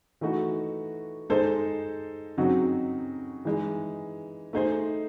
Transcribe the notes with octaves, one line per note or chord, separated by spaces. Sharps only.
E3 A3 D#4 F#4
G#3 D#4 A4 C5
C#3 F#3 C4 D#4 F#4
E3 G#3 D#4
A3 D#4 G#4 C5